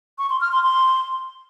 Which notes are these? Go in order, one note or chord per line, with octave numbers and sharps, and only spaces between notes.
C#6
C6
F6
C6
C6